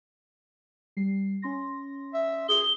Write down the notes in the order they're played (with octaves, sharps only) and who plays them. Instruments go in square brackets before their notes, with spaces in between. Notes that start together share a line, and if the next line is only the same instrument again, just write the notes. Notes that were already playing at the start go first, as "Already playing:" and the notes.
[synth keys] G3 C7
C#4 C6 A#6
[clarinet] E5
[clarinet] G#4 [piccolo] G7